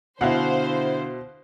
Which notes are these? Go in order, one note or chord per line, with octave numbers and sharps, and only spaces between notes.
B2 D3 E4 C5 F5 F#5